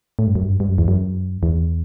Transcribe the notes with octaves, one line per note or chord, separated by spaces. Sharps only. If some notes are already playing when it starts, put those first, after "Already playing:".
A2
G2
F#2
G2
G2
F#2
E2
F#2
E2